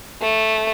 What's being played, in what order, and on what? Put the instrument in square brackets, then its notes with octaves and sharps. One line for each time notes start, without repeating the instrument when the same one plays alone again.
[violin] A3